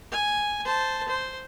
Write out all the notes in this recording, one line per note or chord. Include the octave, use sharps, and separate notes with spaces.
G#5
C5 A5
C5